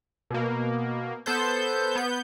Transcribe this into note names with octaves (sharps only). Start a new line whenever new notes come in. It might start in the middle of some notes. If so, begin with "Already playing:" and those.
B2 A#3
B3 A4 C5 G6
B3 G6